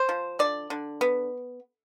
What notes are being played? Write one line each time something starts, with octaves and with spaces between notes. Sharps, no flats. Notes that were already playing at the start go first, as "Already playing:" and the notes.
Already playing: C5
F3
D3 D5
D3
B3